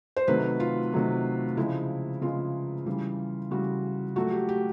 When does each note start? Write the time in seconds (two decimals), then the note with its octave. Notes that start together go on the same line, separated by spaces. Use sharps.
0.17 C5
0.28 C3 D#3 F#3 A3 B4
0.60 F4
0.92 C3 D#3 F#3 A3
1.57 C#3 F3 G#3 E4
2.22 C#3 F3 G#3 F4
2.86 C#3 E3 G3
3.51 C#3 E3 G3 F#4
4.16 A#2 F#3 A3 F#4
4.32 G4
4.49 G4